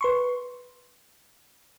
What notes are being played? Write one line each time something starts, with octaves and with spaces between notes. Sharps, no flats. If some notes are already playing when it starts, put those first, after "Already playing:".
B4 C6 C#6